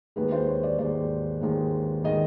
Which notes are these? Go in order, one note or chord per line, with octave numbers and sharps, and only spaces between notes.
D#2 D#3 G#3 B4
C5
C#5
D5
D#2 D#3 G#3 D5
D#2 D#3 G#3
D#3 G#3 D#5